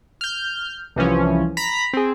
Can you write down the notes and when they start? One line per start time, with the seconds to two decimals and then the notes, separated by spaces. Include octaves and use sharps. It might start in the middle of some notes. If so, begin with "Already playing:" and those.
0.21 F6 G6
0.96 C2 E3 F3 C#4
1.57 A#5 B5 B6
1.94 C4 G#4